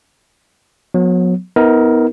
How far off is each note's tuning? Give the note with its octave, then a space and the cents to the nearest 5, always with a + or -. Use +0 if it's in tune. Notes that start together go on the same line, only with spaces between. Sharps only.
F#3 -35 B3 +0
B3 +5 D#4 +45 A#4 +0